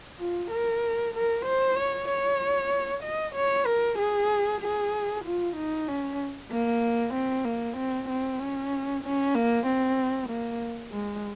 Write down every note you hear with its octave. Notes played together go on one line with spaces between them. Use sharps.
F4
A#4
A#4
C5
C#5
C#5
D#5
C#5
A#4
G#4
G#4
F4
D#4
C#4
A#3
C4
A#3
C4
C4
C#4
C#4
A#3
C4
A#3
G#3